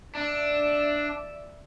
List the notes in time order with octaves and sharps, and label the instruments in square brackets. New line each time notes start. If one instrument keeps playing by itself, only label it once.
[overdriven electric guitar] D4 [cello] D5 E5